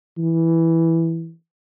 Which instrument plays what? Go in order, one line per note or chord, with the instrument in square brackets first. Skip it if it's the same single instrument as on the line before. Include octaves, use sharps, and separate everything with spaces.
[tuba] E3